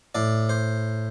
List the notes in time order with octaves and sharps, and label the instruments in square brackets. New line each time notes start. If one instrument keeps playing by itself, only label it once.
[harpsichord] A2 D5
C5